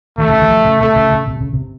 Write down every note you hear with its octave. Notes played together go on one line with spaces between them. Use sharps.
D#3 A3
C#3
D#3
F3
C#3
C3 A3
C#3
C#3
C3
C#3
C3